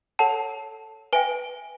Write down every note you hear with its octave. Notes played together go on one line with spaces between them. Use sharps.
A4 C#5 F#5 A5
B4 E5 G5 G#5